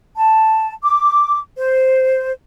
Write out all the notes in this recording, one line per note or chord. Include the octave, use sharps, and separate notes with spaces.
A5
D6
C5